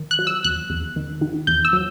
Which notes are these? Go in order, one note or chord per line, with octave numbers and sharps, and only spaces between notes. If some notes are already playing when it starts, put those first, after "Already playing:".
Already playing: D#3
F#6
F#3
E6
E2 F#6
E2
D#3
D#3
E2 G6
E6
F#3